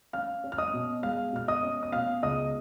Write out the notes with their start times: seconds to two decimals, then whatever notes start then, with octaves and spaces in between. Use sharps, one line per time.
0.13 C#4 F5 F6
0.44 C#4
0.52 F6
0.58 D#5 D#6
0.74 B2
1.03 G#3 F5 F6
1.33 B2 F6
1.48 D#5 D#6
1.63 C#4
1.83 D#6
1.92 B2 F5 F6
2.23 C#2 D#5 D#6